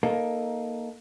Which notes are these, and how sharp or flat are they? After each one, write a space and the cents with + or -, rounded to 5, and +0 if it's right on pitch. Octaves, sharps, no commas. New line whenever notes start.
A#3 +10 D#4 +0 A4 +0